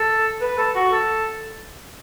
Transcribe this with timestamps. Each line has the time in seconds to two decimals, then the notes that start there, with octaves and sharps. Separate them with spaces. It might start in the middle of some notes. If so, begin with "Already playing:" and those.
Already playing: A4
0.41 B4
0.58 A4
0.75 F#4
0.93 A4